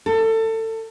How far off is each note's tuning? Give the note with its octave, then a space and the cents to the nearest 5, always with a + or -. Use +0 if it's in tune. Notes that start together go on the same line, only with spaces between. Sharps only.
A4 +25